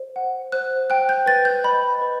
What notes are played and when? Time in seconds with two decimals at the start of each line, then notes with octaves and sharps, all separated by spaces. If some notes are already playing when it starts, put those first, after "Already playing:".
Already playing: C5
0.16 F#5
0.52 C5 F#6
0.90 G5 F#6
1.09 G6
1.26 B4 A6
1.45 G6
1.64 D#5 B5
2.01 B4